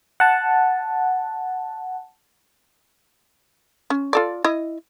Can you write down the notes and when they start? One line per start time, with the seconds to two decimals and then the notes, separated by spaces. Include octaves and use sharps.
0.20 F#5 A5
3.90 C#4
4.13 F4 A4 D5
4.44 E4 D#5